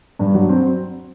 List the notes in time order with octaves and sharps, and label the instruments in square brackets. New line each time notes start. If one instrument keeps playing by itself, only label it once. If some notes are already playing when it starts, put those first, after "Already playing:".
[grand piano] G2
F#3
C4